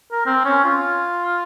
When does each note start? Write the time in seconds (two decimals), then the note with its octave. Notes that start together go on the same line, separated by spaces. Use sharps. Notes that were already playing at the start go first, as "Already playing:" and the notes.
0.12 A#4
0.26 C4
0.45 C#4
0.64 F4